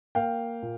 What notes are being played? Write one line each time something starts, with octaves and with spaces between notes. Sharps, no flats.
A#3 F5 G5
A#2